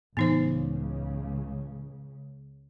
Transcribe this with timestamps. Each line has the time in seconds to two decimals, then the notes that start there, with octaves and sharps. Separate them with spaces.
0.17 C#2 A2 C#3 E3 B3 D#4 C5